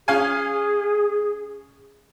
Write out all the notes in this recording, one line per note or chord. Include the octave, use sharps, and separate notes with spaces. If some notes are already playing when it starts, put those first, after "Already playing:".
C#4 G#4 F5 G#5